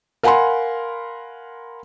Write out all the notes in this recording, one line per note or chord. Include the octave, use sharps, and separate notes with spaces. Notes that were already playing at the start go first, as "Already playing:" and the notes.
A#4 F5 F#5 G#5 B5 C6